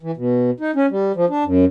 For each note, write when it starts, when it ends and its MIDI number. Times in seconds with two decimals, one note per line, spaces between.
0.03 0.11 52
0.17 0.51 47
0.60 0.71 63
0.76 0.86 61
0.91 1.12 55
1.16 1.25 53
1.29 1.44 62
1.45 1.65 42